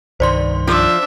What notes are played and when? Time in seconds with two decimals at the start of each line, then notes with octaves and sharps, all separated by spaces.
0.20 C2 G2 D#3 C5 D5 C6
0.67 F3 D4 E5